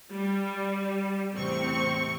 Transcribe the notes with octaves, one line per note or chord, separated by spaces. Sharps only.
G3
A1 E2 C3 C4 C#6